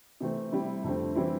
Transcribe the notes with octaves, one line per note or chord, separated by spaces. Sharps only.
C3 E3 A3 C4
C3 G3 C4 E4
F2 D3 A3 C4
E3 G3 C4 E4